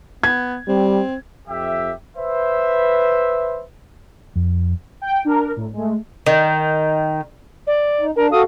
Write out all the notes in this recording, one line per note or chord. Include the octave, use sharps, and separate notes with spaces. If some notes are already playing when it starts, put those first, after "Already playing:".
B3 G#6
G3 C4
F2 G4 E5
B4 C5 E5
F2
G5
D4 A#4
A2
G#3 A3
D#3
D5
D#4
D4 A#4
F#4 A4 F5 D#6